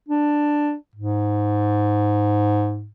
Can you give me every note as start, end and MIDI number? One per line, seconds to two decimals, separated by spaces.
0.08 0.75 62
0.96 2.88 44